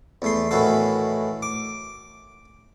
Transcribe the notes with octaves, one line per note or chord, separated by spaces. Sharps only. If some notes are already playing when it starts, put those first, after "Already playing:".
E2 A3 C6
A2 D#3 E3 F#4 A4
D6